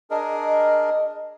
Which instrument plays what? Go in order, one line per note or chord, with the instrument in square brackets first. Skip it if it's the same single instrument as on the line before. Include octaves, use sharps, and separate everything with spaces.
[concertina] D4 G#4 A#4 [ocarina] D#5